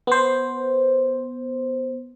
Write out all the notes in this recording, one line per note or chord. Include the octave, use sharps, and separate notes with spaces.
B3 C5